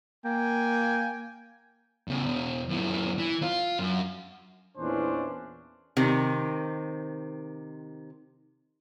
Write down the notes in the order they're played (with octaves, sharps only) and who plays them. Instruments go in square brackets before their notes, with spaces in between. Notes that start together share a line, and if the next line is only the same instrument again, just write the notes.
[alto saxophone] A#3 [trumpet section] G5 G#5
[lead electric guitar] E2 C#3
E2 B2
F#2 E3
E3
F4
F#2
[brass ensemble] E2 A#2 E3 C#4 D4 C5
[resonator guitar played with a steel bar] C3 D#3